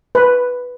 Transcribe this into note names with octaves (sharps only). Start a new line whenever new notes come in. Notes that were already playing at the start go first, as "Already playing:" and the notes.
B4